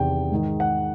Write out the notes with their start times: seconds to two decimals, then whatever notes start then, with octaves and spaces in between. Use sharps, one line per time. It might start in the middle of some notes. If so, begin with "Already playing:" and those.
Already playing: E2 C3 D#3 G5
0.31 G#2 D#3
0.60 F#5